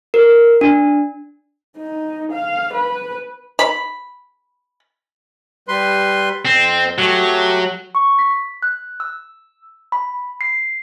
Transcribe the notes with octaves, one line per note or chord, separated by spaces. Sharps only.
A#4
D4
D#4
F5
B4
B5
G3 B4 C6
F2 C4
F#3 A3 G4
C#6
B6
F#6
E6
B5
C7